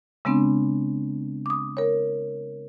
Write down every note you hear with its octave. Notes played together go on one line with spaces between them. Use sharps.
C#3 G#3 B3 C4 D4
D6 D#6
A#4 C#5